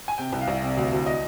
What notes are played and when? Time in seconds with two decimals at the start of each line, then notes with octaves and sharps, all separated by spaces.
0.08 G#5
0.18 C3 G5
0.32 C2
0.41 F5
0.48 C2
0.62 C3
0.77 D2
0.93 D2
1.06 D#5